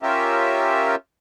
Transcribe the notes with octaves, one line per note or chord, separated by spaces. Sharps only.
C#4 F4 G4 A#4 E5